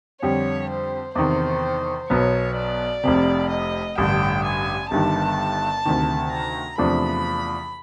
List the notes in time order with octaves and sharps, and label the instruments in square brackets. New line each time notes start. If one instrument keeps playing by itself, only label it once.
[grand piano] F2 D3 G3 [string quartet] C#5
[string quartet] C5
[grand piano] E2 C3 D#3 [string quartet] C5
[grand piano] B1 B2 F#3 B3 [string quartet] C#5
[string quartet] D5
[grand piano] F1 F2 C3
[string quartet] D#5
[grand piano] A1 G2 D3 [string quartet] G5
[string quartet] G#5
[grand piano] G1 G2 D#3 [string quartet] A5
[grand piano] D2 C3 D#3
[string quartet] A#5
[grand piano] E2 C3 F3 A3 D4 [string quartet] B5